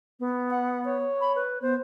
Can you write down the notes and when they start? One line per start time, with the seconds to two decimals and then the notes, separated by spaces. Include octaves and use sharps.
0.20 B3
0.50 F#5
0.85 C#5
1.21 B5
1.36 B4
1.62 B3 C5